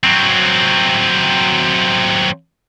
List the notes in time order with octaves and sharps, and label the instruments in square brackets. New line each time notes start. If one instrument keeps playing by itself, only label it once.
[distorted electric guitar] F#3 C4